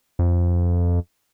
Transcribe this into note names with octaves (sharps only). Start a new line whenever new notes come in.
F2